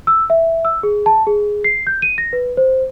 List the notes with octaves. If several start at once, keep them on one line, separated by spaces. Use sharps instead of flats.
E6
E5
E6
G#4
A5
G#4
C7
G6
D#7
A#6
B4
C5